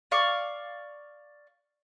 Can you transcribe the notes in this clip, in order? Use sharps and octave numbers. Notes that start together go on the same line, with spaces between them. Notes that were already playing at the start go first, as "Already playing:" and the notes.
D5 F5 C#6 D6